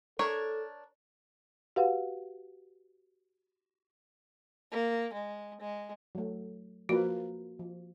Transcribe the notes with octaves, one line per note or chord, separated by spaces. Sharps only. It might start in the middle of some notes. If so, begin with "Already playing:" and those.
D4 A4 A#4 C#5
F#4 G4 B4 F5 F#5
A#3
G#3
G#3
F#3 A3
F3 A#3 F#4 B4
F3